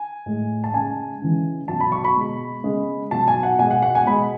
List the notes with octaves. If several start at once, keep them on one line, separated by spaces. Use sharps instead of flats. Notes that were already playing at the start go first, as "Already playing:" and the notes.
Already playing: G#5
A2 G#3
A5
C#3 G#3 G#5
C#3 E3 G#3
B2 F#3 A5
B5
C#6
B5
B2 G#3
C#3 G#3
B2 F#3 A5
G#5
F#5
B2 G#3 G#5
F#5
F#5
G#5
B2 G#3 B5